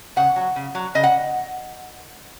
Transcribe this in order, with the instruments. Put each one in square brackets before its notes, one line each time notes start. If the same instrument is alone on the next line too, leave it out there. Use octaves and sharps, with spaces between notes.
[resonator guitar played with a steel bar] C#3 F#5
F#3
C#3
F#3
C#3 D#5
F#5